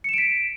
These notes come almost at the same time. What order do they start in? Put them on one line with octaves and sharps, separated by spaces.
C#7 E7 D7 B6